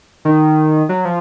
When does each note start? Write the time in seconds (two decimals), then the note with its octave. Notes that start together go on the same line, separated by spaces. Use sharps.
0.25 D#3
0.89 F#3
1.05 F3